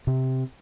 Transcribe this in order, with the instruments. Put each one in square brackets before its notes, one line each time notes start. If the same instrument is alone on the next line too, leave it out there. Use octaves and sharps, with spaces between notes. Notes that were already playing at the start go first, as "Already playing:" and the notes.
[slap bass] C3